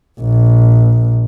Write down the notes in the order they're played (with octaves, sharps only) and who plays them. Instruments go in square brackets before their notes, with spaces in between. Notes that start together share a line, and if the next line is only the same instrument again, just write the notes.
[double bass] A#1